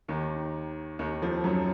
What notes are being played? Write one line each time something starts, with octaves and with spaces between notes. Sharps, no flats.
D#2 D#3
D#2 D#3
F2 F3
F#2 F#3